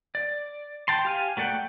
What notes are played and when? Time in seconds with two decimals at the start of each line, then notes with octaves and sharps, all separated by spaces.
0.15 D5
0.88 G5 A5 C6
1.05 G4 F5 G#5
1.37 F#3 A3 D5 F#5 G5